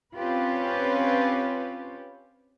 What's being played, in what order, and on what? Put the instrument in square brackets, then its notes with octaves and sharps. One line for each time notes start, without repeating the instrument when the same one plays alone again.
[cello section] C4 C#4 F4 G4 B4